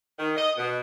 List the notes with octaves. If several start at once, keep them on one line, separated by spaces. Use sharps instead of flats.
D#3
D#5
B2